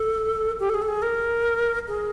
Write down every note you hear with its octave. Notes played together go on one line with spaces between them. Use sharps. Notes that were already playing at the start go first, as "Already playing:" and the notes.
Already playing: A4
G4
A4
G#4
A4
G#4
A#4
G#4